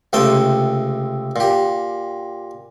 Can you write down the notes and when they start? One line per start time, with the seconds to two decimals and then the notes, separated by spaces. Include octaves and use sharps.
0.13 C#2 C3 A3 G5 A5
1.36 A#2 G4